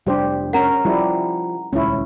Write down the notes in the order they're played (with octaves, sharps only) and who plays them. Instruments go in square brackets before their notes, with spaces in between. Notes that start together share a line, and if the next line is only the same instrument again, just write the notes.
[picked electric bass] F1 D4 [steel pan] G3 G4 C5
[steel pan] C#4 A#4 [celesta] F#5 A#5
[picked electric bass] F3 [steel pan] G3 E4
[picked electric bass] D#1 C#2 [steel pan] C#4 E4